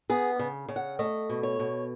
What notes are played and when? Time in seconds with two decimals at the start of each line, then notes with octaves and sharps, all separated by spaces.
0.10 B3 G#4
0.39 C#3
0.69 C#3
0.76 F#5
0.99 A3 D#5
1.30 B2
1.43 C#5
1.59 B2